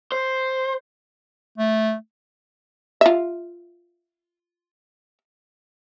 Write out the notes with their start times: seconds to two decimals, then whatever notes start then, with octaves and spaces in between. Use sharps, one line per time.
0.12 C5
1.58 A3
3.01 F4 E5